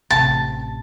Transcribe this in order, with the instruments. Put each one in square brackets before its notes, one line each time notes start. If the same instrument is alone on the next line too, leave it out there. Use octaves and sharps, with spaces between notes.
[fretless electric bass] A1 C3 [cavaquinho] A5